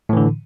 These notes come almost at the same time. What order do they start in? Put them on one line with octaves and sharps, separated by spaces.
A2 E3 D3